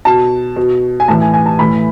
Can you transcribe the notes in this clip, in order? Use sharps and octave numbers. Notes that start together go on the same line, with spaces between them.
B2 A5
B2
G#5
A2 E3 A5
G#5
G#5
A5
A2 E3 B5